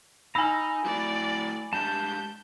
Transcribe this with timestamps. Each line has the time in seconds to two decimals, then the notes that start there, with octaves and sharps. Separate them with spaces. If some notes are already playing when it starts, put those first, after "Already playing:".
0.35 D#4 G#5 A#5 B5 E6
0.85 A3 E4 F#4 D5
1.73 G#3 D4 G4 A5 G6